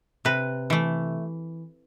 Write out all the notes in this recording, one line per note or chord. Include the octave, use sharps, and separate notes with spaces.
C3 B4
E3 A3